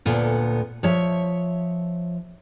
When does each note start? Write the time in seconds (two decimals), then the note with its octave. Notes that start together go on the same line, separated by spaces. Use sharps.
0.05 D2 A#2 B3 A4
0.83 F3 C#5 E5